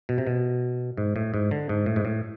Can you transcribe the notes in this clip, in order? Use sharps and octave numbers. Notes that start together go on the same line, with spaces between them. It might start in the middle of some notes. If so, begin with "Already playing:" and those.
B2
C3
B2
G#2
A2
G#2
D3
G#2
A2
G#2
A2